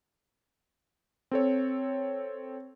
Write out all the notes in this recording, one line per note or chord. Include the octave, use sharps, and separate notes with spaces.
C4 A4 C#5